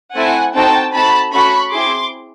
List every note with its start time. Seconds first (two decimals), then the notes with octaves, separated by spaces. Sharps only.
0.15 A3 C4 E4 A4 F#5 G#5
0.54 C4 D#4 F#4 A4 G5 A5
0.93 C4 D#4 F#4 A4 A5 B5
1.32 A3 C#4 F#4 A4 B5 C#6
1.72 C4 E4 G#4 C6 D6